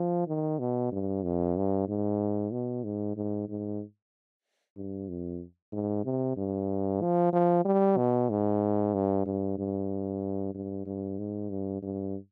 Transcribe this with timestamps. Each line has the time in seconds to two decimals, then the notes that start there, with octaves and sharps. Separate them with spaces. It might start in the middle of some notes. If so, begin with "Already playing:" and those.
Already playing: F3
0.28 D#3
0.59 B2
0.92 G2
1.23 F2
1.56 G2
1.88 G#2
2.52 B2
2.84 G#2
3.17 G#2
3.49 G#2
4.76 G2
5.09 F2
5.73 G#2
6.05 C3
6.37 G2
7.01 F3
7.33 F3
7.65 G3
7.97 B2
8.30 G#2
8.94 G2
9.26 G2
9.58 G2
10.54 G2
10.86 G2
11.19 G#2
11.50 G2
11.82 G2